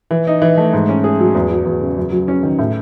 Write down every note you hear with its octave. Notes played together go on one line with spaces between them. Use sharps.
E3
D#4
E3
A3
G#2
C#4
G#4
F#3
E2
F#3
E2
C#3
F#2
F#3
C#4
D#3
A2